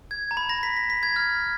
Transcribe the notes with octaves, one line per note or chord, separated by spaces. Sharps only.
G#6
A#5
B5
A#6
B6
B6
B6
G#6
F6